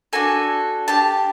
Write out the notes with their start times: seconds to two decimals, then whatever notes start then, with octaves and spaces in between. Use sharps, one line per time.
0.13 D4 F#4 A4 G#5
0.88 D4 G4 A5